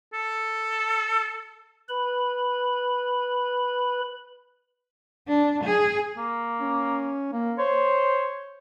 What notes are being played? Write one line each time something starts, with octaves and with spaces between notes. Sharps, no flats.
A4
B4 B5
D4
G#4
A#3
C#4
A#3
C5 C#5